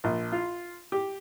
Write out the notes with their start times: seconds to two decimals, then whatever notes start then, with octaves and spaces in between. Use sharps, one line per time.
0.04 A#1
0.32 F4
0.92 G4